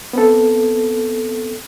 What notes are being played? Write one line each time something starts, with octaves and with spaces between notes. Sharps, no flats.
B3 C4 A4